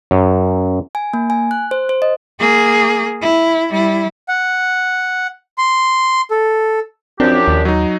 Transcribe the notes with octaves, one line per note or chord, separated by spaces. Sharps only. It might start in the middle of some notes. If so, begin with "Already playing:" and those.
F#2
G#5
A#3
G#5
F#6
C5
C5
D#5
A#3 G#4
E4
G3 E4
F#5
C6
A4
F#2 F3 C4 D4 G4
D#2
F#3 D#4